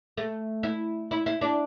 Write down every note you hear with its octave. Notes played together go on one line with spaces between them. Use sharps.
A3
E4
E4
E4
D4